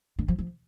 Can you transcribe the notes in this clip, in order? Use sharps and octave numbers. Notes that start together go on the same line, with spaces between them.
D3
F3
F3